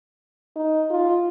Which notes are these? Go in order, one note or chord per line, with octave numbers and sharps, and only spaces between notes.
D#4
F4